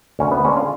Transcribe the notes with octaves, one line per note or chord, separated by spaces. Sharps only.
D2 C#4
B3
D3 G#3 C#4
F4